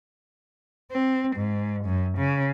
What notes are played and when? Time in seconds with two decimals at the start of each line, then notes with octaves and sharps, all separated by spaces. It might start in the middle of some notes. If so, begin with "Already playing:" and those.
0.91 C4
1.36 G#2
1.85 F#2
2.18 C#3